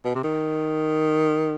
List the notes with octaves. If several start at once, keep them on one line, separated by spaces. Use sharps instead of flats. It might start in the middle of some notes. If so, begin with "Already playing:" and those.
B2
C3
D#3